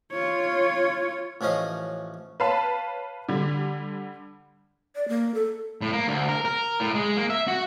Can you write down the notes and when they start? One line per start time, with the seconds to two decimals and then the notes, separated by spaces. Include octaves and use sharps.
0.12 F4 C#5
1.41 A1 F3 C#4 D#5 F5
2.40 B4 C#5 F5 A5 B5
3.29 D3 G3
4.96 D5
5.08 A#3
5.34 A4
5.81 A2
5.93 A#3
6.08 D2
6.29 A#4
6.45 A#4
6.80 A2
6.95 G#3
7.17 A#3
7.30 E5
7.48 F#4